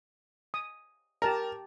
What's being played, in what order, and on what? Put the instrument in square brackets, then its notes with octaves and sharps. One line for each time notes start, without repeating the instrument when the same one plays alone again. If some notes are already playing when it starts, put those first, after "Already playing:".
[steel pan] D#6
[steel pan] G4 A5 A#5 [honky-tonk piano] A#4